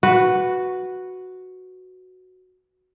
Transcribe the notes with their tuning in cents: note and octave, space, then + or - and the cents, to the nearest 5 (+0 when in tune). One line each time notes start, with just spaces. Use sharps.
F#4 +0 B4 +0